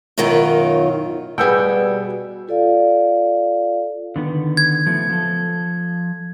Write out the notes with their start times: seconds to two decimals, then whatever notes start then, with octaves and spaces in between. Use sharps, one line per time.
0.18 F#2 B2 D#3 F#3 F4
1.38 B2 G3 G#4 B4 F#5 G5 E6 G6
2.48 F4 A4 D5 F5
4.16 D3 D#3 B3
4.57 G#6
4.86 F3 A3 B3
5.09 F3 A4